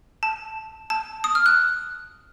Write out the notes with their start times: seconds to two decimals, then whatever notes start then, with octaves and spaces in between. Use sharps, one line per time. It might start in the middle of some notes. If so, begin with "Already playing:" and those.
0.23 A5
0.90 A5
1.24 D#6
1.35 F6
1.46 F#6